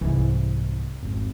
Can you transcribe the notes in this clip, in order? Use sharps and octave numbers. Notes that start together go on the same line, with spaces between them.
C2 G#2 E3 E4
G#1 F2